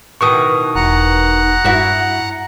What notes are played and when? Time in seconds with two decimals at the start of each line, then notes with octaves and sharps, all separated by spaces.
0.21 B2 D#3 E3 C#6 D#6
0.75 E1 F#5 A#5 F#6
1.65 G2 E4 F#4 E5